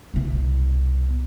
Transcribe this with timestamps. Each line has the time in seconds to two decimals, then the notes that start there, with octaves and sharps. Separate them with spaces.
0.14 C2 B2